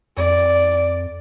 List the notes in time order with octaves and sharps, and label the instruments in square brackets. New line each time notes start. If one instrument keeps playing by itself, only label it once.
[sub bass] F2 [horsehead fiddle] D5